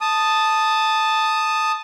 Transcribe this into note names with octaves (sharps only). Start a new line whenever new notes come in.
A5 D#6